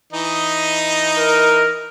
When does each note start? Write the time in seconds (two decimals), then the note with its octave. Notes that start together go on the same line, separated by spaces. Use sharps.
0.13 E3 D#4 D#5
1.18 A#4